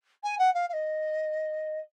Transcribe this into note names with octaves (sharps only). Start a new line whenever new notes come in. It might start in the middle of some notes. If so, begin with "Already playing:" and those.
G#5
F#5
F5
F5
D#5